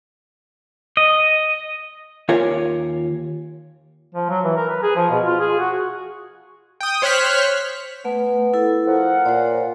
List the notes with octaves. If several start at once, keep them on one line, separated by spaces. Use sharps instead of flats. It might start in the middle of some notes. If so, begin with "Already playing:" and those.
D#5
D#2 F4 A#4 C#5 G#5
F3
F#3
E3
A#4
B4
G#4
F3
B2
F4
G#4
F#4
G5 D#6
C5 C#5 F6 F#6 B6
A3 B3
E4 A4
F3 A#4 F#5
A#2 C5 C#5